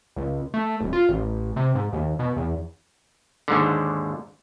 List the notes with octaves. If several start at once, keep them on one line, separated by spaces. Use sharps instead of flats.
C#2
A3
D#1
F4
A1
C3
G#2
D#2
B2
E2
D#2 G#2 D3